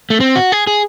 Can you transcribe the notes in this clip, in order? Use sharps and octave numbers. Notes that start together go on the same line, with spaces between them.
A3
C4
F#4
G#4
G#4